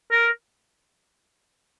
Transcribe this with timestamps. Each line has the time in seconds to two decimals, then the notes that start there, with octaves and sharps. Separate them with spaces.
0.11 A#4